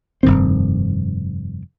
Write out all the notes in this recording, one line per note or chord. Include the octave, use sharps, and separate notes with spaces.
F1 G2 D#3 C4